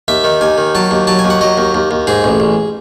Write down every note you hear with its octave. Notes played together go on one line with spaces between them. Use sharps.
D#2 E5
D#3
D#2 G#5
D#3
F#3 A5
D#2
F#3 A5
G#5
D#2
F#5
F#3 D#5
D#2
D#2
D#2
G#2 G#4
A1
A1